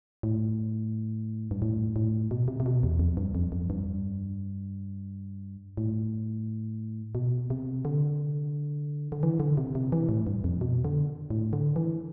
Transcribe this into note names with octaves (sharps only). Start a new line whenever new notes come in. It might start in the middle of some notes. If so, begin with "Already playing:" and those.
A2
G2
A2
A2
B2
C3
C3
B2
E2
F2
G2
F2
F2
G2
A2
B2
C3
D3
D3
E3
D3
C3
C3
E3
A2
G2
F2
B2
D3
A2
D3
E3